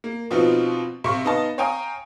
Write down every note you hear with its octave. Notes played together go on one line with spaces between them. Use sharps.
A#3
B2 F3 B3 C4 D#4 F4
C3 F5 C#6
B3 D#4 D#5 F5 A5
C#5 F5 G5 G#5 A#5 D#6